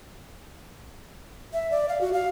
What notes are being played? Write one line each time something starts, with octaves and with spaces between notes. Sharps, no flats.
E5
D5
F5
F#4
F5